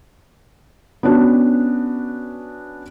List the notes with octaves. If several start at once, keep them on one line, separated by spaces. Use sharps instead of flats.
B3 C#4 D4 F#4